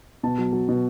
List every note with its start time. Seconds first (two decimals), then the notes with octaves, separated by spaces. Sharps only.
0.23 B2 A5
0.38 F#3
0.53 F#3
0.69 B2